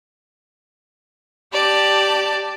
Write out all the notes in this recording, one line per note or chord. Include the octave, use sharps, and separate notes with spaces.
G4 D5 A5